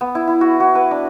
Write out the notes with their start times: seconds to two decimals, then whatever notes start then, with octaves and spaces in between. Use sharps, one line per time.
0.01 B3
0.15 E4
0.27 E4
0.41 F#4
0.60 F#4
0.75 B4
0.91 D4